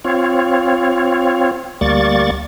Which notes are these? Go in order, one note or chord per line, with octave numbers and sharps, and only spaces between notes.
C4 F4 C#5
D2 G3 A#3 D5 C#6 A6